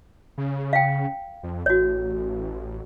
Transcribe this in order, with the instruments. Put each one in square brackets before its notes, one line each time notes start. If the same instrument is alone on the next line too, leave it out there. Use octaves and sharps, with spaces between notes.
[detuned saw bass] C#3
[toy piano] F5 G5
[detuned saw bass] F2
[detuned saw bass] A1 [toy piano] F#4 C#5